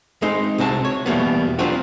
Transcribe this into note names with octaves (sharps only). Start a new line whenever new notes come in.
G#3 C4 D#4 C5
C2 C3 F#4 A5
C#5
E2 B2 G3 A#3 B3
F#3 C4 D4 F4 F#4